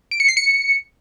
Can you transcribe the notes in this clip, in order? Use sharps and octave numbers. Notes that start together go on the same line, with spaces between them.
D7
C#7
C7
C#7